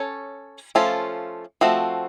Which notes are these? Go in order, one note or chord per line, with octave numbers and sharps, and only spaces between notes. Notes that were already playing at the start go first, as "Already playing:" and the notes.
Already playing: C#4 A4 C#5
F3 A3 C#4 F4 A4
F3 A3 C4 F#4